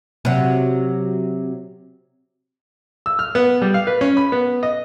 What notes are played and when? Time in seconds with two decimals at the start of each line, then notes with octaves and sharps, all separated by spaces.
0.25 C3 F#3
3.06 E6
3.19 F6
3.35 B3
3.62 G3
3.74 F5
3.87 B4
4.01 C#4
4.17 B5
4.32 B3
4.63 D#5